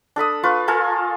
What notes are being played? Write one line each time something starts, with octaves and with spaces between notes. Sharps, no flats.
D4 A4 B5 D#6
F4 B4 C#6
F4 A4 A#4 G#5